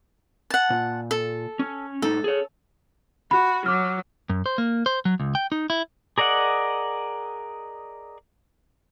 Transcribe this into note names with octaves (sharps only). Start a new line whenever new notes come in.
F#5 A5
A#2
A4
C#4
A2 D#4 A4
G#4 C#5
F#4 B5
F#3 D6 F6
F#2
C5
A#3
C5
F#3
C#2
G5
D#4
E4
G#4 A#4 D5 D#5 F#5